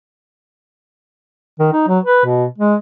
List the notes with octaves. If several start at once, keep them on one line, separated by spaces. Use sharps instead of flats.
D#3
D#4
F#3
B4
B2
G#3